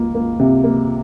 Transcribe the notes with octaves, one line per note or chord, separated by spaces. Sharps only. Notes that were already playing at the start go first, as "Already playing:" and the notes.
Already playing: C#2 A#3
A#3
C3
A#3